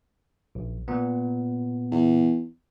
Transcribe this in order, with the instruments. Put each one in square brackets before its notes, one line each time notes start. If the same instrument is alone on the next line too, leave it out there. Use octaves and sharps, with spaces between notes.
[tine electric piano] A#1
A#2 B3
[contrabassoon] E2